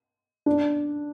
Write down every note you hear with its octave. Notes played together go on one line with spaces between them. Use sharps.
D4